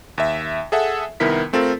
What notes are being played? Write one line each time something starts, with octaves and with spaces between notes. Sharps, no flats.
D#2 E5
G#4 A4 E5 F#5
C2 D#3 B3 E4 A#4 B6
A3 C4 F4 A4 A#4